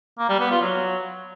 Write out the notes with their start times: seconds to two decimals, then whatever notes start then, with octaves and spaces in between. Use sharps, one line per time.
0.18 A#3
0.29 G3
0.40 B3
0.51 F4
0.61 F#3